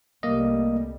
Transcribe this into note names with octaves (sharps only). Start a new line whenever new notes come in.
C2 G3 A3 A#3 D#5